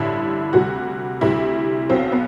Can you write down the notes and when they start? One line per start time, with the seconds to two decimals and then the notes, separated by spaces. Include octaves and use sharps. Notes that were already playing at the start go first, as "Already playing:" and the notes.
Already playing: A1 G2 D3 G3 E4
0.53 D2 C3 G3 F#4
1.21 D2 C3 G3 E4
1.90 B1 B2 F#3 C4
2.12 B3